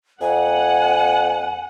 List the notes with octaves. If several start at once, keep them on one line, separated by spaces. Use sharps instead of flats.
F2 F#5 G#5